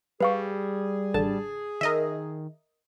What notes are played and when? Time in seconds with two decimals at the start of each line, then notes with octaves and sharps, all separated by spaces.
0.21 G3 G#4 B4 F5 C#6
1.14 A1 D3 A5
1.81 D#3 A#4 D#5 E5